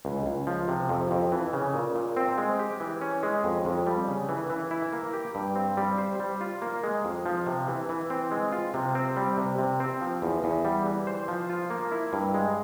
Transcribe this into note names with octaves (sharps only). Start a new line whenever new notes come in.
C#2
C#2
F3
C3
F2
F2
E3
C#3
A#2
A#2
C4
G#3
G4
E3
C#4
G#3
F2
F2
G3
C#3
E3
E3
E4
A#3
G4
G2
C4
G3
C5
G3
F4
A#3
G#3
F2
F3
C3
E3
E3
C4
G#3
F4
C3
C4
G3
C3
C3
C4
F3
E2
E2
G3
E3
C5
F3
F4
A#3
E4
G2
G#3